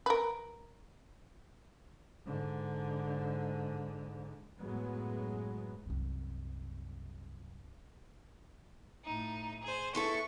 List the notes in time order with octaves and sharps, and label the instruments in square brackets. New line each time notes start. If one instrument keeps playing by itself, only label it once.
[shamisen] A#4 B4
[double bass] G#2 D3
[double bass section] F#2 A2 F#3 G#3 B3
[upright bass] C2 F#2
[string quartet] A2 D#4
G#4 C5
[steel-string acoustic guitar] B3 E4 A4 [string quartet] C#6